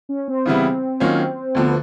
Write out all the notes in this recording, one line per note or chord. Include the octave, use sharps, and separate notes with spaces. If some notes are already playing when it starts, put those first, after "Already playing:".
C#4
C4
C#3 E3 G3 B3 E4
D#3 F#3 A#3 C#4 F4
D2 D3 F3 B3